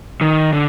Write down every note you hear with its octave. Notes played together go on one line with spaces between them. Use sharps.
D#3
D3